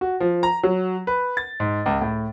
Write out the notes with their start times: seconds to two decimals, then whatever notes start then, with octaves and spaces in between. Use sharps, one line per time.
0.01 F#4
0.20 F3
0.43 A#5
0.63 F#3
1.07 B4
1.37 A6
1.60 G#2
1.86 C#2
2.01 A2